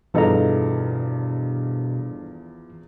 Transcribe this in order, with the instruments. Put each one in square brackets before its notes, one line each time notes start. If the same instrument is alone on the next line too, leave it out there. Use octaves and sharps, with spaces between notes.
[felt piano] E2 F3 [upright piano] G2 A4 D#5 [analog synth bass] B2 [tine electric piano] E3 A#5